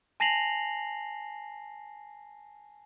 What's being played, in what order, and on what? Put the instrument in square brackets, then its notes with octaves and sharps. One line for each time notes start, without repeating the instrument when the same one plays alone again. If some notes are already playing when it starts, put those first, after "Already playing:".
[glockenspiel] G#5 A5 A#6 C7 F7 F#7